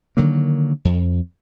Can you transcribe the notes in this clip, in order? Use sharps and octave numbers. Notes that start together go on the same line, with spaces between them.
D3 D#3 F#3 A#3
F2